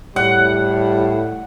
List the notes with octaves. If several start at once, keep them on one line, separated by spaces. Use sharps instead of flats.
A2 G3 F#5